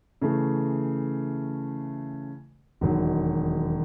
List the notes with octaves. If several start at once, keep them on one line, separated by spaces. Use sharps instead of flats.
C#3 E3 A3
E1 D#2 D#3 F#3